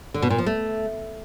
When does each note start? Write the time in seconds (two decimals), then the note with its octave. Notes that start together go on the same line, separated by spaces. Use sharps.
0.14 D3
0.22 B2
0.30 A#2
0.38 F3
0.46 A3